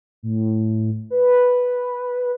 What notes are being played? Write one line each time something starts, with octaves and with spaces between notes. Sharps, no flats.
A2
B4